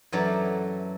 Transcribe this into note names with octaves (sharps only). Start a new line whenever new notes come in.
F#2 E3 F#3 A4 D5 A#5